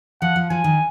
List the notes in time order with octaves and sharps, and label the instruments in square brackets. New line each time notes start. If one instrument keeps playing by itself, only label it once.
[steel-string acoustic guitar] F3 [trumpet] F#5
[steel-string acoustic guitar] F3
[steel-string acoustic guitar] F3 [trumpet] G#5
[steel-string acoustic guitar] D#3